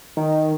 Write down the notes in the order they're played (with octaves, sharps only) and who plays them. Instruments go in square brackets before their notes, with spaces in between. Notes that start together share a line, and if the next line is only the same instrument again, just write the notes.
[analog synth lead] D#3